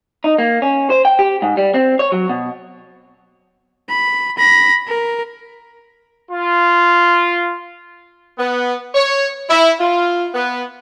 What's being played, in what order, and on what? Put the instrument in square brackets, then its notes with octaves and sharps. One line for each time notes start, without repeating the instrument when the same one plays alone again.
[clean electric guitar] D#4
A#3
C#4
C5
G5
G4
G#2
G3
C4
C#5
F#3
B2
[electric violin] B5
B5 A#6
A#4
[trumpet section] F4
[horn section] B3
C#5
E4
F4
B3